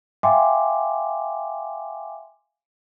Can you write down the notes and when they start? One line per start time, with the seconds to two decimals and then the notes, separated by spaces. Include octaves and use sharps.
0.23 E5 F5 G5 G#5 C6 D6